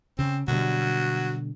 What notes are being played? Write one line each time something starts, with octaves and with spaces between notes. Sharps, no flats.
C#3 C4
B2 D3 F#3 G3